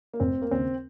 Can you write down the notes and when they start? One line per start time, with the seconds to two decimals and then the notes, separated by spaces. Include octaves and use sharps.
0.14 A#3
0.20 F1 C4
0.42 A#3
0.51 D#2 C#3 C4